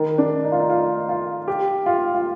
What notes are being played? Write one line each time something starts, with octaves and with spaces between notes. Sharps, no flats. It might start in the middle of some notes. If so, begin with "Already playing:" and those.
Already playing: D#3
D4
D#4
F4
D#4
F4
F4
G4
F4
F4